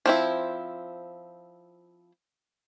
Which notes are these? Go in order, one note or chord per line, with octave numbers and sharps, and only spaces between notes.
F3 C4 E4